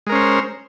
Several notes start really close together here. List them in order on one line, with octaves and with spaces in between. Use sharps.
G#3 A#4 C#4 C5